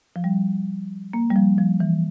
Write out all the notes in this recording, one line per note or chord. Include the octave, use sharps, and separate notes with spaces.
F3
G3
A#3
G3
F3
F3
E3